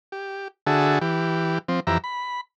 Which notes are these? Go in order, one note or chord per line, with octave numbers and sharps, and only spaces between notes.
G4
D3 F#4 G#4 E5 A5
E3 G4
F3 C4
F2 E3 G4 E5 A#5
B5